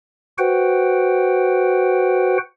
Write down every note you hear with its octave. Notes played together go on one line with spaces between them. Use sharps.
F#4 B4 C5 F#5 G5